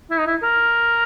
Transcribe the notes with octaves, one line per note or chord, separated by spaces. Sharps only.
E4
D#4
E4
A#4